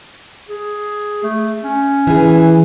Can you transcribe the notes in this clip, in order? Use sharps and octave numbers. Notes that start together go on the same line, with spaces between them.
G#4
A3
C#4
E3 G#4